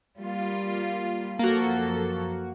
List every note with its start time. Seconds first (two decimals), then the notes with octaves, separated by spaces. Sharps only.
0.20 G3 A#3 F4
1.39 F#2 F3 A#3 F#4 A4